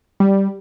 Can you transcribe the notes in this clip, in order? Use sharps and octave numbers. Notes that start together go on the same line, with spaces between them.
G3